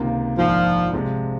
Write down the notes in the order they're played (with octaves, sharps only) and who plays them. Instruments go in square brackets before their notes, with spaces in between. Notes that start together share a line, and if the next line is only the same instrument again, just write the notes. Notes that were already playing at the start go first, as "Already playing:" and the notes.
Already playing: [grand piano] C#2 C3 D#3 A#3 F4
[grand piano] A#1 G#2 D#3 A#3 [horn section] F3
[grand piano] C3 F3 G#3